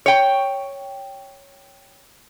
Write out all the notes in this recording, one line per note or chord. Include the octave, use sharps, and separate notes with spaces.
C#5 G5